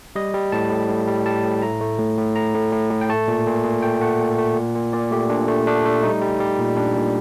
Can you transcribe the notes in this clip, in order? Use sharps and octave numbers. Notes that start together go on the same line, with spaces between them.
G3 D#5
G3
A2 A5
A2
A2
G3
G3 A5
A2
A3 A#5
A3
A2
A2
A2 A#5
A2
A2
A2
G5
A3 A5
A#2
A#2
A#2
A3 G5
A3 F#5
A#2
A3
A#2
A#2
A#2 D5
A3 G4
A#2 D4
A3
A3 D4
A3
G3 D#4
G3
G3
A#2
G3 D4
A#2